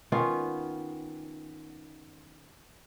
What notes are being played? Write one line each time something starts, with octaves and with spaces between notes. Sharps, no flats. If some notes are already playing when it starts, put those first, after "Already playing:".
D#3 B3 C#4 F4